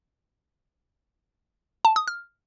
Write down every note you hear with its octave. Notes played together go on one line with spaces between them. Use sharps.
A5
D#6
F6